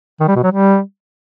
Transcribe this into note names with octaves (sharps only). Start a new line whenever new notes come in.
D#3
G3
B2
F#3
G3